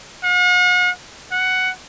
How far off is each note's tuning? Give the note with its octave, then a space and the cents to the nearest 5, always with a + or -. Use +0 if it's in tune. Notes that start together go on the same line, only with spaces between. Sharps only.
F#5 -45
F#5 +10